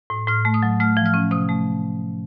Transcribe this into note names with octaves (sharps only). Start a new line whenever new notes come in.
A2
A2 F6
A3
D#6
F#3
A3 F6
F3
F6
C#4
C3 D#6
A3